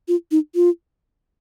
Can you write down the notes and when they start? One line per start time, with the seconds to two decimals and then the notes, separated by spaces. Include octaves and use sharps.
0.08 F4
0.31 D#4
0.55 F4